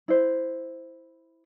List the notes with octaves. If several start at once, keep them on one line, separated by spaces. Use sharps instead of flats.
E4 C5 E5